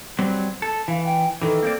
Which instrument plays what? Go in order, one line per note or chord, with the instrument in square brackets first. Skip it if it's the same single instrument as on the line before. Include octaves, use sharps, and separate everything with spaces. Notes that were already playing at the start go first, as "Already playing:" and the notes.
[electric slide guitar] F#3 G3 C4
A4
[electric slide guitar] E3 [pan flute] F5
[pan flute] G5
[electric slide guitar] D#3 E3 [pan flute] A4
[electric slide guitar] A#3 C4 D5